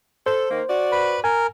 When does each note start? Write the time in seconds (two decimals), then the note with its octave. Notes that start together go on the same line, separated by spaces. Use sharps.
0.26 A4 C5
0.50 D#3 A#3
0.69 F#4 D5
0.92 B4 B5
1.24 A#4 G#5